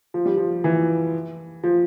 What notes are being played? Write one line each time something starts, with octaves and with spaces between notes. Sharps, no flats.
F3
G3
F3
E3
F3